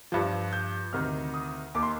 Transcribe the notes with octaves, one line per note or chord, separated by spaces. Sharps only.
G2 F3
G6
D2 C3 D#3 F6
D#6
D#2 D#3 D6
C6